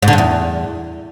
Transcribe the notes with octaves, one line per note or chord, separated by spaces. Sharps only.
G#2
D3
G2
E2